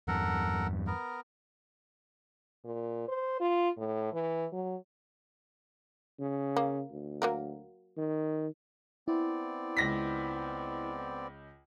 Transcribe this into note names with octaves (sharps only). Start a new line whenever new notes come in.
E2 G2 A4 A#4 F#5
B3 A#4
A#2
C5
F4
A2
E3
F#3
C#3
A#3
D2
F#3 A#3 A#4
D#3
B3 C4 E4 D5
C#2 A#6 B6